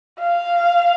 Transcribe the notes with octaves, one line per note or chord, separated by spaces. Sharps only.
F5